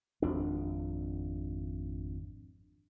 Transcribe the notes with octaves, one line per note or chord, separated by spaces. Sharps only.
G#1 F2 D4